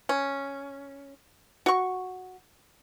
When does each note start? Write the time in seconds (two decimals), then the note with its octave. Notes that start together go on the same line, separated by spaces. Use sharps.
0.09 C#4
1.66 F#4 C#6